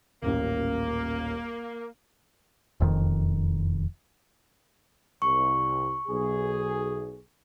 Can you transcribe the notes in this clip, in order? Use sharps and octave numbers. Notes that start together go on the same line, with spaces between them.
D#1 A1 A#3
E1 F2 D#3
C2 C#6
B1 G#4